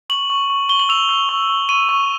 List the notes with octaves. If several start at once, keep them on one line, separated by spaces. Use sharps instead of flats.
C#6 F#7
C#6
C#6
C#6 G7
F#7
E6 F7
E6
C#6
C#6
C#6 D#7
C#6